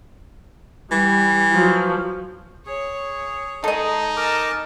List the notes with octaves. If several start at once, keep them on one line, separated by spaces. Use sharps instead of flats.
E3 G3
F3 F#3
G#4 C#5
G#3 D#4 A4 D#5
A#4 G#5 A5 D6